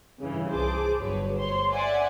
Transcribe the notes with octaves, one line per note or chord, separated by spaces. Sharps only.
G2 C#3 E3
C2 G#4 C5 A5 D6
G1 G2 F#3 B4 C#5
C5 C#5 C6
D5 E5 F#5 G#5